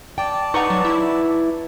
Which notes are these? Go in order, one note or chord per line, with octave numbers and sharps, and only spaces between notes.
D5 G5 A5
D#4 B4 F#5 A#5 C#6
F#3
E4